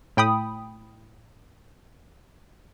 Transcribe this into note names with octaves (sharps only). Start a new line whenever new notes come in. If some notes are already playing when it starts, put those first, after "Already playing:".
A2 G5 B5 D#6